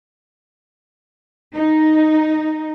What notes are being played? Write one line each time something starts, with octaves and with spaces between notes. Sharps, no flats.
D#4